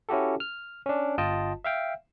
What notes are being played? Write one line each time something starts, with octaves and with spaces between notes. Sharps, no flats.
C#4 E4 F#4 G4 A4
F6
C#4 D4
G1 F4 D#5 G5 A5
E5 F5 G5